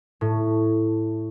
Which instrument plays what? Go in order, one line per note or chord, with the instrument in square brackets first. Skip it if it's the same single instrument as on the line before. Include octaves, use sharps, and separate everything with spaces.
[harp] A2